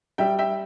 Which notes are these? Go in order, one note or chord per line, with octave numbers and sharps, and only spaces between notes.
G3 E5 G5
E5 G5